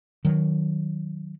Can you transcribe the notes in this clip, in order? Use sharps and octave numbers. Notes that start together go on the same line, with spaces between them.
D#3 F#3